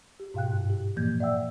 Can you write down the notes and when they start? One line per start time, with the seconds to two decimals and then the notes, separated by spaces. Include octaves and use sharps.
0.20 G4
0.34 G#2 B2 F5 G5 F#6
0.50 G2
0.70 G4
0.96 A#2 E3 F3 A#3 G6 G#6
1.20 D5 E5 F#5 G5 E6